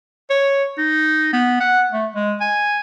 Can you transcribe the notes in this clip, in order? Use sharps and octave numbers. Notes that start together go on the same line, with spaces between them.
C#5
D#4
B3
F#5
A3
G#3
G#5